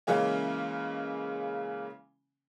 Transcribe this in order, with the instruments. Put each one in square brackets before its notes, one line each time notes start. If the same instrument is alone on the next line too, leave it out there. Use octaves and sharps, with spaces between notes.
[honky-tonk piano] C#3 E3 G#3 A#3 C#4